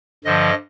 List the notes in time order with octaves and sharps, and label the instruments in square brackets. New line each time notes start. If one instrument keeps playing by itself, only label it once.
[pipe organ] G2 D3 F3 D#5